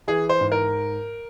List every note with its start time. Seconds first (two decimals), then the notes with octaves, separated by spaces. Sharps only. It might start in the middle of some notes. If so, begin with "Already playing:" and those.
0.08 E3 G#4
0.29 C5
0.41 G#2
0.52 A#4